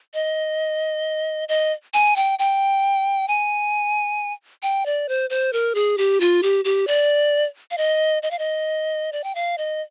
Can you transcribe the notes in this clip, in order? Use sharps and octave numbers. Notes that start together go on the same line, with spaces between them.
D#5
D#5
G#5
G5
G5
G#5
G5
D5
C5
C5
A#4
G#4
G4
F4
G4
G4
D5
F5
D#5
D#5
F5
D#5
D5
G5
F5
D#5